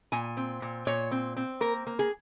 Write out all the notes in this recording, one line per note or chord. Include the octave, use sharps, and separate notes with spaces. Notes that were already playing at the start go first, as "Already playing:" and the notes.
A#2 G#5
C4
A#2
A#2 C#5
C4
C4
A#3 A#4
A#3
G#4